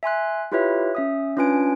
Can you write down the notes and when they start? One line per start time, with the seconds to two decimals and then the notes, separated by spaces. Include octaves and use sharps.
0.03 E5 G#5 C6 F#6
0.52 E4 F4 G4 B4 C#5 E5
0.95 C#4 E5 D#6
1.37 C#4 D4 F4 B4 G#5 D7